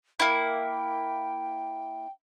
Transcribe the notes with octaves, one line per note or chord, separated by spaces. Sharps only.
A#3 E4 G5